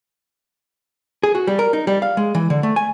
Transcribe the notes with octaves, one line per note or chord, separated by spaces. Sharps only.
G#4
F#4
G3
A#4
D#4
G3
F5
G#3
E3
D3
A3
G#5